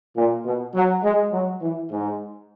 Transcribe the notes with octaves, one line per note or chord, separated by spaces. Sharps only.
A#2
B2
F#3
G#3
F#3
E3
G#2